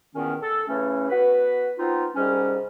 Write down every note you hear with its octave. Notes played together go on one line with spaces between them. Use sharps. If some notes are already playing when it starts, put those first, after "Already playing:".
E2 A#2 D#3 B3 C#4
A4
C#3 E3 A3 C#4
B3 F#4 B4
B3 C4 D#4 F4
C2 G#2 G3 C#4